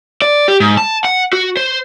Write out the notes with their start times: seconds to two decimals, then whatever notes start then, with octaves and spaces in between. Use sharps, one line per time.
0.22 D5
0.48 G4
0.60 G#2
0.77 A5
1.05 F#5
1.33 F#4
1.57 C5